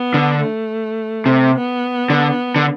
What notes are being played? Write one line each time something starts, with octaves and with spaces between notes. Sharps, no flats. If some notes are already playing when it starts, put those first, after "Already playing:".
Already playing: B3
D3
A3
C3
B3
D3
D3